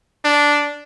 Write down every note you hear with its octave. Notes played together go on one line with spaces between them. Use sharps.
D4